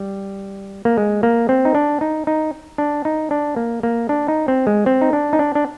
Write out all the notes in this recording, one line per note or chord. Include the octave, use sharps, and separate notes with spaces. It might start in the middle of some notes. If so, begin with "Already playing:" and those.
Already playing: G3
A#3
G#3
A#3
C4
D#4
D4
D#4
D#4
D4
D#4
D4
A#3
A#3
D4
D#4
C4
G#3
C4
D#4
D4
D#4
D4
D4